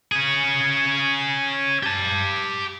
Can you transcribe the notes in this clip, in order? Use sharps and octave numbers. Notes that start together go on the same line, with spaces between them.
C#4 G#4
G4 A5